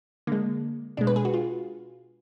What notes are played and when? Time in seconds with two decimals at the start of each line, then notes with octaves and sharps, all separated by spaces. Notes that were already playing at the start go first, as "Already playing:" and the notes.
0.27 D3 G#3 A#3
0.97 B2 G#3 D4
1.07 B4
1.16 G#4
1.25 F#4
1.34 F4